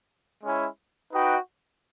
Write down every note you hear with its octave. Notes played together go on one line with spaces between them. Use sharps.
G#3 C#4 E4
D#4 F#4 B4 D#5 G5